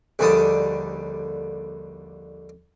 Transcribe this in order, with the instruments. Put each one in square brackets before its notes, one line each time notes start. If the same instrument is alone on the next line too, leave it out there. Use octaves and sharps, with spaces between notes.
[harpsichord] A#1 D#2 D3 G3 A5 D#6